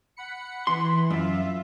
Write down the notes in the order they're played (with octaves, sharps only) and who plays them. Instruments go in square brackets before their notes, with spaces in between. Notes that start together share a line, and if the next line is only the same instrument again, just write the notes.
[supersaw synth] F#5 B5 C#7
[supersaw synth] E3 B5 [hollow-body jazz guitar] C6
[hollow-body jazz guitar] F#2 [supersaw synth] F4 E5